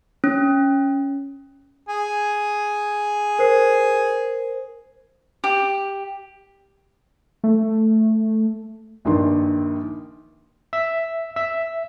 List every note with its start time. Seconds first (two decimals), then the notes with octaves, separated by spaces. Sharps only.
0.24 C#4
1.89 G#4
3.39 A#4 C5 C7
5.44 G4
7.44 A3
9.05 A#1 G2 D#3 C6
10.73 E5
11.36 E5